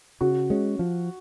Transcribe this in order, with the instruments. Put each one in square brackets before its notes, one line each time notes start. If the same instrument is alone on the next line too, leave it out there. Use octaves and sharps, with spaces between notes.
[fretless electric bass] C#3 [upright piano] F#4
[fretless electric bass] G#3 C#4
F3